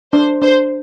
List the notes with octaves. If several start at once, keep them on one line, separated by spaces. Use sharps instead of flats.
D4 C5
D4 C5